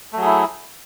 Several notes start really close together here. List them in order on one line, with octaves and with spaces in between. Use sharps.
A3 F#3 G#4 E4